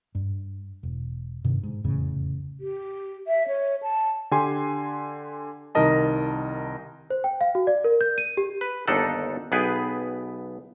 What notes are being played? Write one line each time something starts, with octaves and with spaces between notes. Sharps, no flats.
G2
E1
G2 C3 D#3
G#2
F1 E2 A2 C#3
G4
E5
C#5
A5
D3 G4 G#5 C6
C2 D#3 D#4 A#4 D#5 A5
C5
G5
F5
F#4
D5
A#4
G6
D#7
G4
B4
G1 D#2 D4 D#4 A4 F#5
B1 B3 G#4 B4 G5